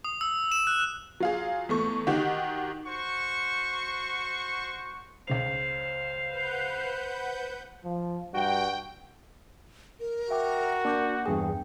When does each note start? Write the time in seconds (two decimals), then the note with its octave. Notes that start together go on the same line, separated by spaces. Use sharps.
0.04 D#6
0.21 E6
0.52 E7
0.67 F#6
1.20 F#3 F4 G#4
1.69 E2 A3 C#6
2.07 D#3 D#4 F#4 G4
2.87 F#4 C5 C#6
5.28 C#2 C#3 C5 F5 F7
6.29 B4 F#5 G6
7.84 F3
8.34 G2 F#4 G5
10.00 A#4
10.31 F#4 E5 G5 D6
10.85 A#3 D4 D6 G6
11.26 E2 G2 G#4 G5